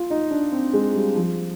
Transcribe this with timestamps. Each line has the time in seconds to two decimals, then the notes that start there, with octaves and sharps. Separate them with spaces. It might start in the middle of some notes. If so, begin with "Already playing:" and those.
Already playing: F4
0.10 D#4
0.31 D4
0.52 C4
0.73 G#3
0.95 G3
1.16 F3